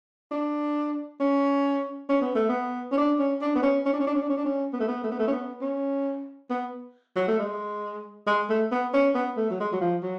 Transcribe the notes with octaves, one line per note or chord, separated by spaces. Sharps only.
D4
C#4
C#4
B3
A3
B3
C#4
D4
C#4
D4
B3
C#4
C#4
D4
C#4
D4
C#4
D4
C#4
D4
C#4
B3
A3
B3
A3
B3
A3
C#4
B3
C#4
B3
F#3
A3
G#3
G#3
A3
B3
C#4
B3
A3
F#3
G#3
F#3
F3
F#3